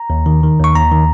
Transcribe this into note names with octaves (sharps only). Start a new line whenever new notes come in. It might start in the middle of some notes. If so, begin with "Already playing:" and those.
Already playing: A#5
D#2
D#3
D#3
D#2 C#6
D#2 A#5
D#3